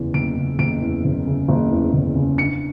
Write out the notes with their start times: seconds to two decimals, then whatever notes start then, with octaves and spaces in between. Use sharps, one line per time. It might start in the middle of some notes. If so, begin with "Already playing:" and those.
Already playing: F#1 E2 C#3
0.14 F#1 D7
0.37 C#3
0.58 F#1 D7
0.82 E2
1.04 F#1
1.26 C#3
1.48 F#1
1.71 E2
1.93 F#1
2.15 C#3
2.38 D4 C#7